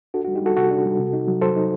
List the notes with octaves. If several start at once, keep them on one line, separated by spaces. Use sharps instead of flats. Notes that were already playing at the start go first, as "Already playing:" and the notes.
D4 F#4 A4
F#4
G3
D#4 G4
G3 F#4 A4
C3 F#4 A4
D4
G3
C3
D#4
F#3
F#3 A4 C5
D#4